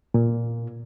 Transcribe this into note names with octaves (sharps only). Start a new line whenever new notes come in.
A#2